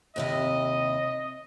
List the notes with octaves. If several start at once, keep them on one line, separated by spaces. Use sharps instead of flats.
D#2 C3 E4 D#5